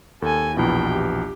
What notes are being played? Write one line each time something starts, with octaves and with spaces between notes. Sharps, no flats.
D#2 A4 G#5
A#1 E2 B2 E4 G5
G4